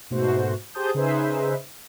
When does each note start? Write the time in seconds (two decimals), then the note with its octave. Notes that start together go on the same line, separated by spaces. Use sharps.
0.10 G#2 B2 A3 F#4 C5
0.74 G4 G#4 C5 A5 D#6 G6
0.94 C#3 D#4 G#4 B4 C5 E5